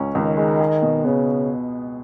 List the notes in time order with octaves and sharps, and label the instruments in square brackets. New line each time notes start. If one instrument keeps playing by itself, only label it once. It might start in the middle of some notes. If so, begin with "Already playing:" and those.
Already playing: [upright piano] C#2 C#4
[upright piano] C#2 [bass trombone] D#3
[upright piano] G#3
G#4
B2
[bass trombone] C#3 [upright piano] B3